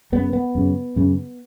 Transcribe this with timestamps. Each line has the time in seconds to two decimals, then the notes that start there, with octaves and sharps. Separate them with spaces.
0.12 F#2 C#3 B3
0.33 B3
0.55 F#2 C#3
0.96 F#2 C#3